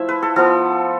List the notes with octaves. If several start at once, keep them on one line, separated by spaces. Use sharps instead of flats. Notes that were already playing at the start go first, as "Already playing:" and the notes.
Already playing: F3 A3 E4 E5
B4
A4
F3 B3 F4 A4